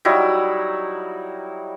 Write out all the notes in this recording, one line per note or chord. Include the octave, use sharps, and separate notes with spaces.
F#3 G3 D#4 E4